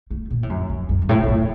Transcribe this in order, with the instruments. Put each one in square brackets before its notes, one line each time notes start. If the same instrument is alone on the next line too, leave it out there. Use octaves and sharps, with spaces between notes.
[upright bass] A3
A#2
A2
F#2
F2
F#2
F#2
A2
F#2
A2